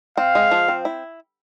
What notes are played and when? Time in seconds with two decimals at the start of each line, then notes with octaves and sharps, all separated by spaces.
0.17 C4 F5
0.35 G#3
0.51 F3
0.68 C4
0.85 E4